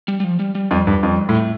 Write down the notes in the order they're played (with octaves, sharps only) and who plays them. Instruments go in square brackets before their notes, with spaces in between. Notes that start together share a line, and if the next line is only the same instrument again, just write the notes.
[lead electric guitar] G3
G3
F3
G3
G3
[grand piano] F2 [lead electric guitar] G3
[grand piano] G2
F2
A2
[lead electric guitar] A3